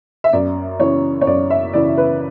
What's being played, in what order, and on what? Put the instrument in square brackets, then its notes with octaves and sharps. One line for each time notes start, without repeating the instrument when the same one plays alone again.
[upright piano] E5
F#2 D5
C#3 E3 C#5
C#5
F#2 D5
E5
C#3 E3 D5
B4